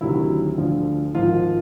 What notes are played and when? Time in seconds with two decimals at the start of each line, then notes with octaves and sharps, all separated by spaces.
0.01 D2 C3 D#3 F#3 E4
0.58 D2 D3 F3
1.15 G#1 G#2 F3 F4